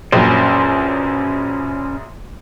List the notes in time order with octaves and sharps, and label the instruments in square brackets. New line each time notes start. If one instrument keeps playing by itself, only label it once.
[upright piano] A#1 F#2 [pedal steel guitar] C#4 B4 C5